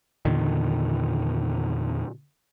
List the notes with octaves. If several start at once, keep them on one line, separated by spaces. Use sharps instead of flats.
E2 A#2 D3 D#3